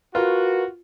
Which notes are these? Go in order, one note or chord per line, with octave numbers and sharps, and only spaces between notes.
F4 F#4 A#4 B4